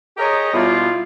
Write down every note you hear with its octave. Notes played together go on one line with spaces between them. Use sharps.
G4 G#4 A#4 C#5 D#5
B2 G3 E4 F4